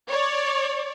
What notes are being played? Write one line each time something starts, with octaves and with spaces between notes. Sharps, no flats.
C#5 D5